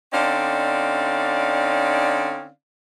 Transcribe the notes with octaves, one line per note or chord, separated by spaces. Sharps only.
D3 C4 C#4 D#4 D5 F5